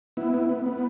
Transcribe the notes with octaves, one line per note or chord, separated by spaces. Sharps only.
B3 E4
B3
B3
B3